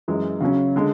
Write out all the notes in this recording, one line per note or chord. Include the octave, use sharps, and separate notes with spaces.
F#2 E3 G#3
C#3 F#3 C#4
D3 G#3